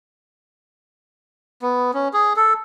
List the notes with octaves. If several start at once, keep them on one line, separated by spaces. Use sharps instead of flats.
B3
C#4
G#4
A4